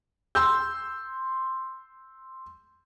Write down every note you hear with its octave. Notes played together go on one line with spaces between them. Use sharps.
C6 E6 G6